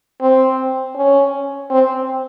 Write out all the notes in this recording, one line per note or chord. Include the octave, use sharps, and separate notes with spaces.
C4
C#4
C4